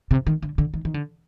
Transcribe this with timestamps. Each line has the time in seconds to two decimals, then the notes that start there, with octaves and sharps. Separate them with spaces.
0.11 C3
0.27 D#3
0.42 D3
0.58 D3
0.74 D#3
0.85 D#3
0.94 D3